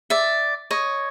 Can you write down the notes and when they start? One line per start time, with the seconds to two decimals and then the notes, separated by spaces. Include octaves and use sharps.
0.10 D5 E5
0.71 C#5 D#5